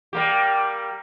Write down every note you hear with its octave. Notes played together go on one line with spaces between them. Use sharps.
G3 A#3 G4